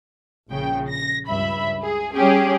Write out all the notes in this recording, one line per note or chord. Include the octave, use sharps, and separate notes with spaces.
A#1 C#3 G5
A#6
C#2 G2 E5 B5
G#4
G3 C#4 G4 G#4